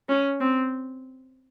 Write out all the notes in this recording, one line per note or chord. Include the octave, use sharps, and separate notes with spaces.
C#4
C4